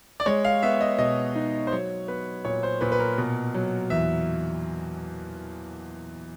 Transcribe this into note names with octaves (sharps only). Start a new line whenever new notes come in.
D5
G#3 C#5
F5
B3 E5
D#5
B2 D#5
D#4
C5
F#3 C#5
B3 B4
A#2 C#5
C5
A#2 B4
B4
A#4
B2
F#3
E2 E5